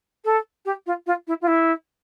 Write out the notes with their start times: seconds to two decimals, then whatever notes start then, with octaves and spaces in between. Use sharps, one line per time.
0.25 A4
0.65 G4
0.86 F4
1.07 F4
1.27 E4
1.41 F4
1.47 E4